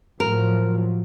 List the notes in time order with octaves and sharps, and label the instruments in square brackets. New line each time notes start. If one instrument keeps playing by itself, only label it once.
[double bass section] A2 F3 F#3 [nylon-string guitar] A#4